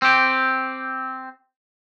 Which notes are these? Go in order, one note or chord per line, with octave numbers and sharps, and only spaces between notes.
C4 G4